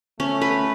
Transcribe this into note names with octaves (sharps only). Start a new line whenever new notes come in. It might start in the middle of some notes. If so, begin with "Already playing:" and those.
A3 C#4
B4